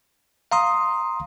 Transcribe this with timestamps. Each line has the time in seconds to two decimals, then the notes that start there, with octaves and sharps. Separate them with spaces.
0.52 F5 A#5 C6 D#6